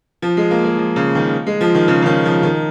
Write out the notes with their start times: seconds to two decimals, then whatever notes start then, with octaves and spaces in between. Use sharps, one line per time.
0.22 F3
0.37 G#3
0.51 A#3
0.64 G#3
0.78 F3
0.96 C#3
1.15 D#3
1.47 G#3
1.61 F3
1.75 D#3
1.88 C#3
2.02 C#3
2.06 D#3
2.25 F3
2.43 D#3